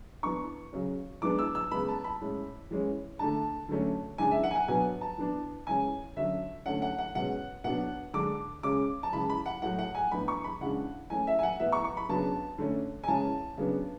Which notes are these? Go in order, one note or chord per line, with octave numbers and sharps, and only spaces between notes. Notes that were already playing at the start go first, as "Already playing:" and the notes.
E3 B3 D4 C#6
C#3 F#3 C#4
E3 G#3 B3 D4 D6
E6
E6
C#3 G#3 B3 B5
A5
B5
A2 G#3 C#4
E3 G#3 C#4
D3 A3 D4 A5
D3 F#3 A3 C#4
C#3 E3 G#3 D4 G#5
E5
F#5
G#5
F#5
B2 F#3 B3 D4 G#5
A5
E3 B3 D4
C#3 E3 G#3 C#4 G#5
D3 F#3 C#4 E5
D3 A3 C#4 F#5
F#5
F#5
B2 G#3 C#4 F#5
B2 F#3 B3 D4 F#5
D3 G#3 D4 D6
C#3 G#3 C#4 D6
A5
C#3 E3 G#3 B5
B5
F#5
A2 F#3 A3 F#5
F#5
G#5
A2 E3 B3 D4 B5
C#6
B5
C#3 E3 G#3 D4 F#5
E3 A3 C#4 G#5
E5
G#5
F#5
A2 E3 B3 E5
C#6
C#6
B5
C#3 F#3 B3 D4 A5
D3 A3 C#4
G#5
C#3 E3 G#3 C#4 A5
C#3 F#3 B3 D4